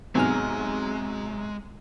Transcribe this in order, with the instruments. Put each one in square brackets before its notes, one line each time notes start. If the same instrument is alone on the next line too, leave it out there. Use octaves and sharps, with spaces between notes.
[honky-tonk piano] G#2 C3 F#3 [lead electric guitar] G#3 [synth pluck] B3 G#5 F6